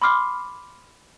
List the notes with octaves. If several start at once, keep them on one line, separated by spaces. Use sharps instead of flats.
B5 C6 D6 F6 C7